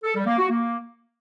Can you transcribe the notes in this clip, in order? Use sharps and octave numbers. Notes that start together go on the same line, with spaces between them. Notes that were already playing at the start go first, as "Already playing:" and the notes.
A4
G3
A#3
F#4
A#3